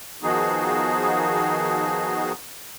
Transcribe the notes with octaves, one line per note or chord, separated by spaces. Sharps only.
D#3 F3 B3 D#4 F#4 G#4